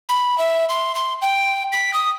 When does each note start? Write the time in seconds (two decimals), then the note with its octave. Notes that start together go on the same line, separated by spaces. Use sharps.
0.09 B5
0.38 E5
0.69 C6
0.95 C6
1.22 G5
1.72 B6
1.93 D#6